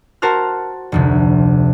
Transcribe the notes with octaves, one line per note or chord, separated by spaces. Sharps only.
F#4 A#4 C5 A5 F6
F1 D2 C3